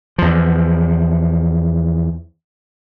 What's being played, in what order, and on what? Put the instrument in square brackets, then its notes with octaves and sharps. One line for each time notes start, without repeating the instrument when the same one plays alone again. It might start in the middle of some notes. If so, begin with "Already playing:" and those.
[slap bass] E2 F3